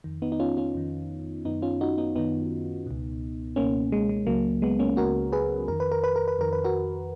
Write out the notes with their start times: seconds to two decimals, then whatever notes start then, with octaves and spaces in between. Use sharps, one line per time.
0.04 F2 D#3
0.22 B3 D#4
0.32 D#4
0.40 C#4 F4
0.57 C#4 F4
0.75 F2 D#3
1.45 F#2 D#3 B3 D#4
1.62 C#4 F4
1.81 D#4 F#4
1.98 B3 D#4
2.15 F#2 D#3 B3 D#4
2.87 C#2 B2
3.56 C#2 B2 A#3 C#4
3.92 G#3
4.09 G#3
4.27 C#2 C#3 F#3 A#3
4.62 G#3 B3
4.79 A#3 C#4
4.97 C#2 C#3 F#4 A#4
5.32 G#4 B4
5.68 F2 D#3 A#4
5.80 B4
5.92 A#4
6.04 B4
6.16 A#4
6.28 B4
6.39 F2 D#3 A#4
6.53 B4
6.64 F#4 A#4